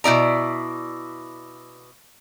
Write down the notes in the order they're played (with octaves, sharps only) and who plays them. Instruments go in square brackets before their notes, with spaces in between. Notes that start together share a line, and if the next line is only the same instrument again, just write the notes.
[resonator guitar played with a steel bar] B2 E4 D5 A#5